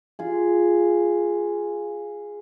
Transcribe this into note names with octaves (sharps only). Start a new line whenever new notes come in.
F4 G#4